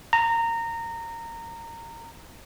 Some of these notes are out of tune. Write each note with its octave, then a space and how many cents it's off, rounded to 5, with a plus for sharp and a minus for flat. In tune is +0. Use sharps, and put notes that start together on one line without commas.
A#5 -20